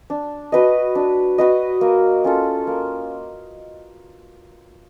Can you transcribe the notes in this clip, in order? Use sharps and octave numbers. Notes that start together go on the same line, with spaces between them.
D4
F#4 B4 D#5
D4
F#4 B4 D#5
A#3
C#4 F4 A4
A#3